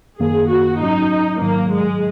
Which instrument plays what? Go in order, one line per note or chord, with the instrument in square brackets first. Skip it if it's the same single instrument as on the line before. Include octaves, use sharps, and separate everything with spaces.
[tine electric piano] F#2 D#3 A#3 [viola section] G#4
[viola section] F#4
[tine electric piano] G#2 F#3 C#4 [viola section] D#4
[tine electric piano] G#2 D#3 F#3 [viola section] A#3
[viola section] G#3